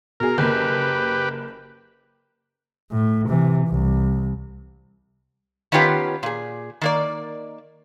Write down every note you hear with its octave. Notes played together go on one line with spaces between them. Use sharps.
B2 G#4 A#4
F#1 A#3 G4 B4
A2
C3 E3
C2
D#3 B3 C#4 F4 G4 B4
A#2 G#4
D#3 A#3 D5